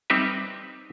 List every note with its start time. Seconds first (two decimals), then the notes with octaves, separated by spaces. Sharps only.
0.10 G3 C4 D#4 G4 B4 E5